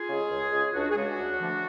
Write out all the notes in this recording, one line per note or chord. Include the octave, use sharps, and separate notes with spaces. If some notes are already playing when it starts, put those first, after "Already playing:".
Already playing: F4 G#4
C#3 G#3
C#2
C#3 G#3
C#2 D4 F#4
G#4
C#3 G#3 D4 F#4
D2
D3 F3 A3